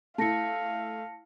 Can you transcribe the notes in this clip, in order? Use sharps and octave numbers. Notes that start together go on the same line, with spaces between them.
A3 E4 F5 A5 A#6 C#7